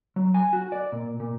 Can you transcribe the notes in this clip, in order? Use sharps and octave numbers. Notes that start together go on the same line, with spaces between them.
F#3
G#5
F#4
D5
A#2
A#2